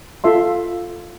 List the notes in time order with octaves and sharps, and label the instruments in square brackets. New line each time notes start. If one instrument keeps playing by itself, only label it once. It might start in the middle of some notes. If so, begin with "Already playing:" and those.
[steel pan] F4 A4 E5 C6